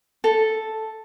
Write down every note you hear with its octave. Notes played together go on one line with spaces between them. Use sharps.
A4